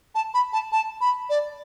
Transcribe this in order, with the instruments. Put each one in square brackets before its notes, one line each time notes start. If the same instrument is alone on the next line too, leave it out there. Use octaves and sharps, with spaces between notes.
[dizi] A5
B5
A5
A5
B5
D5